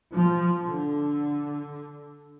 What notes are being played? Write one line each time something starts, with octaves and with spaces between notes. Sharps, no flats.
F3
D3